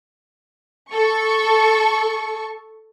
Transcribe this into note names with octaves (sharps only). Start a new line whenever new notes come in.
A4 C#6